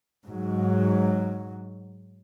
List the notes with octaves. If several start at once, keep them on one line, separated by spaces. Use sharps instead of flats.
G#2 F#3